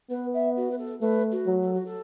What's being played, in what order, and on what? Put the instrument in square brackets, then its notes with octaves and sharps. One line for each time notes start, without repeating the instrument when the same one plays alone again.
[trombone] B3 [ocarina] B4
[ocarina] E5
F#4
B4
A4
[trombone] A3 [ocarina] B4
[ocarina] F#4
[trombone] F#3
[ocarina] A4
F#4
A4